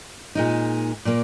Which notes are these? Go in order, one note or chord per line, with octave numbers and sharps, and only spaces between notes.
A#2 G#3 D#4
A#2 A#3